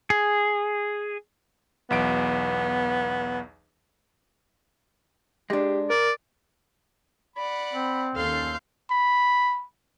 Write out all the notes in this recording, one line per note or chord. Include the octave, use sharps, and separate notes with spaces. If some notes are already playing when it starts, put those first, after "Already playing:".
G#4
B1 E2 B3 D7
G#3 D4 G4
A#4 D5
D5 F#5 B5
C4
D#2 D#3 C#4 A4 F5 C6 G6
B5